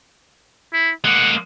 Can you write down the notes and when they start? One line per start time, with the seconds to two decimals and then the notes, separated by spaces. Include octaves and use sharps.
0.73 E4
1.05 G#3 A#3 F#5